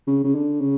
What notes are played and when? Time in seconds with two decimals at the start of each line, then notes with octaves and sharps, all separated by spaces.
0.07 C#3
0.24 C#3
0.35 D3
0.61 C#3